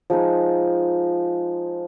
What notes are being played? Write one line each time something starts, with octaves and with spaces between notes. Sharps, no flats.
F3 G#3 D#4